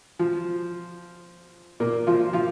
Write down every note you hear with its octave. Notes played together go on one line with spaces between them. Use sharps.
F3
A#2 A#3
F3 F4
F3 F4